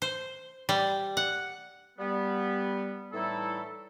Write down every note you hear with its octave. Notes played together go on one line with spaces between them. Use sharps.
C5
G3
F#5
G3 B3
A2 E3 G3 D#4 E4 A4